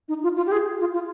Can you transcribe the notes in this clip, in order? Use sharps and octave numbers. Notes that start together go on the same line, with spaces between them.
D#4
F4
F4
G4
G#4
F4
F4